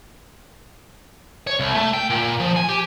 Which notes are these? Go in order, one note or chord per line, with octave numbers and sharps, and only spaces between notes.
C#5
C2
A3
G5
A#2
F3
G#5
G4